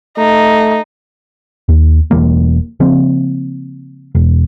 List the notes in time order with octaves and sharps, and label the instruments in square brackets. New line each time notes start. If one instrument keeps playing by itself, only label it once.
[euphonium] A3 [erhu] D#4
[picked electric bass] D#2
E1 F2 E3 A#3
C#3 F3 A#3 C4
E1